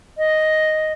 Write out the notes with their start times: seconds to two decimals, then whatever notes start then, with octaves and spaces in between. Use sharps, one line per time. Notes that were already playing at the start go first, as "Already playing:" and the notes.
0.18 D#5